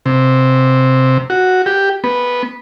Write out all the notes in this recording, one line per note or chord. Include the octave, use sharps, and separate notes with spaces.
C3
F#4
G4
B3